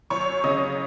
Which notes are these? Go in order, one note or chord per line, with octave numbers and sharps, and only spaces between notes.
F#2 C#5 C#6
C#3 D#5 D#6